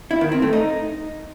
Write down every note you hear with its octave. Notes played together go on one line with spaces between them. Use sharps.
E4
D#3
C4
A3
D#4